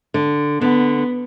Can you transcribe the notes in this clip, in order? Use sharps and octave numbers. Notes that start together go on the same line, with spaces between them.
D3
D3 B3